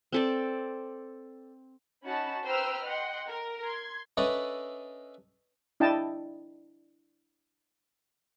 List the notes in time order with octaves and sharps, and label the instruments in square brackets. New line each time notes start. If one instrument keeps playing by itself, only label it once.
[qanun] C4 A4 D5
[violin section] C#4 D#4 F#4 A5 B5
B4 C5 G5 A#5 E6 F6
D#5 F#5 G5 C6
A#4
C6 G#6
[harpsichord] C#4 D4 A4 B4 D#5 E5
[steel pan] D4 E4 D#5 G5 A5